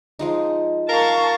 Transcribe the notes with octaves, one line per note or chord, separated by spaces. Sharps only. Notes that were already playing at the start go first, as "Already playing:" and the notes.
F3 G#3 D#4
A#4 F5 A5 C#6